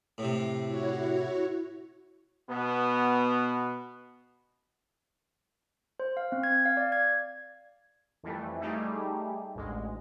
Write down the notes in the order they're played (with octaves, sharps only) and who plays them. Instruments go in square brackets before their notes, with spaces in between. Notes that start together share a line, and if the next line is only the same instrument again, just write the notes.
[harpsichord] A2 C3
[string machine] E4 F#4 C#5
[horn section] B2 B3
[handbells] C5
F5
C4
G#6
F5
D5
G#6
[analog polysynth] F2 E3 G3 A3
G3 A3 D#4 G4 G#4
A1 D2 G#3